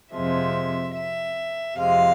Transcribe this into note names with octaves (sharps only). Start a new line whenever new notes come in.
F2 C3 F3 G#3 E5
E5
F2 C3 G#3 F5